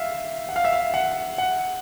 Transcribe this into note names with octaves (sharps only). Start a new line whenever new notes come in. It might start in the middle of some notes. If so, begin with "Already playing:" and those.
Already playing: E5 F5
F#5
F5
E5
F5
F#5
F#5